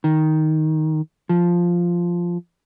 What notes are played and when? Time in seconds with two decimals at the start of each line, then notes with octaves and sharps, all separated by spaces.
0.04 D#3
1.29 F3